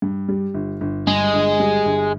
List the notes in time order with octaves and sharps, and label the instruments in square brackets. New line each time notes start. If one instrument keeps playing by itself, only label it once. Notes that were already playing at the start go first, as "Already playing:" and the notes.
[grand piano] G2
G3
G1
G1
[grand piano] G2 [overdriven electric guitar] G#3
[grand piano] G1
G3
G1